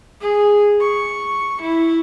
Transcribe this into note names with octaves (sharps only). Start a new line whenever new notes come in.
G#4
C#6
E4